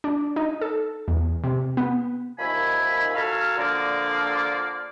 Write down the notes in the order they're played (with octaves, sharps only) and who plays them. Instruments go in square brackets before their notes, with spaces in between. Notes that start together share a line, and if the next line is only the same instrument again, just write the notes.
[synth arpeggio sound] D4
D#4
A4
E2
C3
B3
[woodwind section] D#2 D#3 F3 E5 G#5 B5
F#4 A4 F5 G#5 A#5 F6
D3 F3 A#3 D5